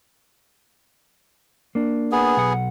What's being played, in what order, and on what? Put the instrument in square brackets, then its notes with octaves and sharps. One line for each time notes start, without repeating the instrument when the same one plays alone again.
[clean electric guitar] A#3 D4
[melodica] B3 G#4
[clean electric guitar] B1 F#5